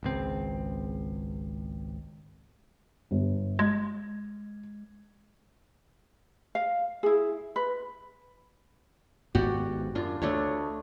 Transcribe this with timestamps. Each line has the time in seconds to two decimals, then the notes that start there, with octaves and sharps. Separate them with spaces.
0.03 G#1 C#2 C4
3.11 G1
3.59 G#3 G#6
6.55 F5
7.03 E4 G#4
7.56 B4
9.35 G#1 G#2 B3 F#4 G4 D5
9.95 F#2 D4 F4
10.22 D2 A3 D4 C#5